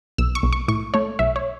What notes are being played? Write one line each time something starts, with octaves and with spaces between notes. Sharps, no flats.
B1 E6
C#6
B1
C#6
A2 C#6
A3 C#5
B1 E5
C#5